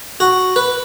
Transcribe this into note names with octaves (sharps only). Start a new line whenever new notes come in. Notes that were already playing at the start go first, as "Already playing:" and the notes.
F#4
B4